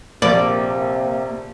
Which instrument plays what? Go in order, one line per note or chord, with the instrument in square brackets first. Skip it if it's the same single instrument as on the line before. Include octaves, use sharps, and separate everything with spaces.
[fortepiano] A#1 [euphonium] C3 [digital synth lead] A#3 [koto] D5